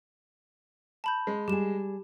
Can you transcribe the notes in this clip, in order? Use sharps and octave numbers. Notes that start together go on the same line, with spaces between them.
A5 B5 G6
G#3
G3 G4 G#4 E7